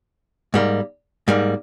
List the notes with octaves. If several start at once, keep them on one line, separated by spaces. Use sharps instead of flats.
G#2 G3 A#3
G#2 G3 A#3